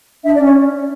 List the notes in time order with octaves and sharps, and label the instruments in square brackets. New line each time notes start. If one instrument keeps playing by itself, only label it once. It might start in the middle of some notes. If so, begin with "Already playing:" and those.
[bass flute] D4 [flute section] E5
[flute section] D5
[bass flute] C#4
[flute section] C#5